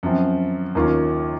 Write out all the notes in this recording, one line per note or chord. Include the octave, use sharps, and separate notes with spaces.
F#2 F3 C4
D#2 D#3 A#3 C#4 F4